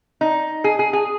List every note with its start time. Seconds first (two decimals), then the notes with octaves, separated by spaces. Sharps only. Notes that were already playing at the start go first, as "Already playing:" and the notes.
0.21 D#4
0.64 G#4
0.79 G#4
0.93 G#4